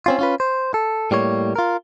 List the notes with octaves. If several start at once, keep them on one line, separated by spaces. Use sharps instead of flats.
C4 C#4 F4
C#4 F4 B4
C5
A4
A2 G3 A#3 C#5
F4 A#4